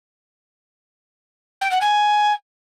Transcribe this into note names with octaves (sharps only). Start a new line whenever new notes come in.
G5
F#5
G#5